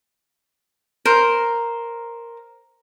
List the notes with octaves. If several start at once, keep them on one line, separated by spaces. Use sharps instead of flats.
A#4 C5